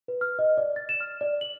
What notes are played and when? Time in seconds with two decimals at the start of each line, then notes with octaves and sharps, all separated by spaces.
0.08 B4
0.21 F6
0.39 D#5
0.58 D5
0.76 A6
0.89 E7
1.00 F6
1.21 D5
1.41 F#7